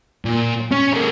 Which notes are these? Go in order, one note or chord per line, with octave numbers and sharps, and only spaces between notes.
A#2
C#4
G#3 A#3